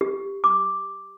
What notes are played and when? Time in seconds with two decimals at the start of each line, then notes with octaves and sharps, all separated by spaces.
0.01 G4
0.44 D6